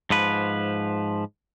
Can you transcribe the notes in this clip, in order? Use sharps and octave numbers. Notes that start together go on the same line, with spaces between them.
G#2 F3 B4